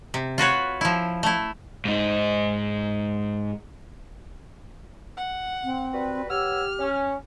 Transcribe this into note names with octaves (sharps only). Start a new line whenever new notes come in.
C3
F4 F#4 B4 C#5
F3 E4
A3 E4
G#2 D#4
F#5
C4
G3 F#4 B4
B3 G4 C#5 E6 F6
C#4